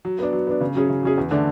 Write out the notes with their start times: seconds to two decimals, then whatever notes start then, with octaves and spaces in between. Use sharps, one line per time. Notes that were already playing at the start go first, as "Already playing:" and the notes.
0.05 F#3
0.19 B3 D4
0.33 F#3
0.47 B3 D4
0.61 C#3
0.75 F#3 C#4 G#4
0.89 C#3
1.03 F#3 C#4 G#4
1.18 E2
1.31 D3 A3 D4